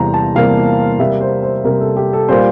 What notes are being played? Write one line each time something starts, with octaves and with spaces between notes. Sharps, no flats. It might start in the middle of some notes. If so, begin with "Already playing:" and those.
Already playing: E2 C3 G3 A#3 C5 A#5
A5
E2 C3 G3 A#3 F5
C3 G3 A#3 E5
C5
C5
C3 G3 A#3 A#4
A4
G4
A4
A#2 G3 A#3 C5